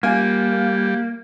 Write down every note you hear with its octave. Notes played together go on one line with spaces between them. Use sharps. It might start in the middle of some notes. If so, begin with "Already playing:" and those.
G3 A#3 F4 G#5